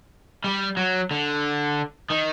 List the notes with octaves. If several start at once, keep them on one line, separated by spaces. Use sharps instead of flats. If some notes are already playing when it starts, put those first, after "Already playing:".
G3
F#3
D3
D#3